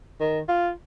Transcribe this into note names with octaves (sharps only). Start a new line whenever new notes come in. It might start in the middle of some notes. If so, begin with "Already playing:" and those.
D#3
F4